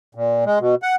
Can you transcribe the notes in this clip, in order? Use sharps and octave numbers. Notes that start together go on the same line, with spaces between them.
A#2
G#3
B2
F#5